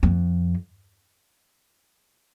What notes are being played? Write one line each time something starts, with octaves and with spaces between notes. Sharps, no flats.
F2